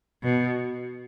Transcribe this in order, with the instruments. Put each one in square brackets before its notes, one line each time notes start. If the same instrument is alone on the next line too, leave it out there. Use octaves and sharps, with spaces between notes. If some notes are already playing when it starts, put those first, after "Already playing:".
[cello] B2